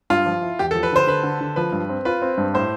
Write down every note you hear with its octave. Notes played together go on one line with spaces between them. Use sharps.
G2 F4
F3
E4
E2 G4
A4
F3
B4
D3 C5
D3 B4
D3
D3
F3 B4
G2
C4
F4 B4
C4
G2
A2 C5